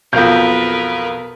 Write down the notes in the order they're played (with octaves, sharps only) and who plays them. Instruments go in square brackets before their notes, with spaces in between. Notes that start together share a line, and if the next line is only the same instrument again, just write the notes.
[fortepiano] B1 F2 [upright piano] B3 G6 [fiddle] A#4 B4 [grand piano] F5